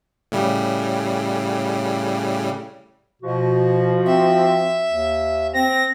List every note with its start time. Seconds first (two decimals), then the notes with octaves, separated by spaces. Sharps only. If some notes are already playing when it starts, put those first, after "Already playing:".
0.32 A2 C#3 G3
3.22 B2 F3 F#4
4.06 C4 E5
4.90 D#2
5.54 C4 A#6